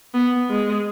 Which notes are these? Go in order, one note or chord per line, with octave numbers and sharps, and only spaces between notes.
B3
G#3